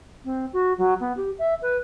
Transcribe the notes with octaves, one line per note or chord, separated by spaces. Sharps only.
C4
F#4
F#3
B3
G4
E5
B4